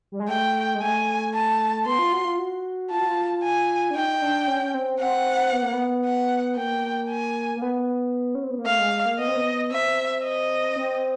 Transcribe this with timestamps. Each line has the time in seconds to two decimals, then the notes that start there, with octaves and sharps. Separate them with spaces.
0.12 G3
0.20 G#3
0.29 A3 G5
0.75 G#3
0.81 A3 G#5
1.34 A5
1.86 B3 C6
1.99 F4
2.12 F#4
2.25 F4
2.39 F#4
2.91 F4 A5
2.99 F#4
3.07 F4
3.43 G#5
3.91 D4
3.95 D#4 G5
4.22 D4
4.47 C#4
4.64 C#4
4.74 C4
5.00 C4 F#5
5.52 B3
5.63 A#3
5.73 B3
6.05 F#5
6.57 A#3 G5
7.10 G#5
7.56 A#3
7.62 B3
8.35 C#4
8.44 C4
8.51 B3
8.58 A#3
8.66 A3 F5
8.79 G#3
8.93 G#3
9.06 A#3
9.19 B3 D#5
9.28 C4
9.37 B3
9.71 C4 E5
10.23 D#5
10.76 C4